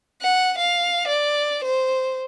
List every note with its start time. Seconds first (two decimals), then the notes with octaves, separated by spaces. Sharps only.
0.22 F#5
0.58 F5
1.08 D5
1.64 C5